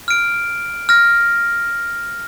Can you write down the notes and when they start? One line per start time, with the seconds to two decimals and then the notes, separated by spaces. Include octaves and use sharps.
0.08 F6 D7
0.89 F6 A#6